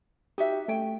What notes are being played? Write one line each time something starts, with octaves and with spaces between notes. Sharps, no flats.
D#4 F#4 G4 E5
A3 C#4 G5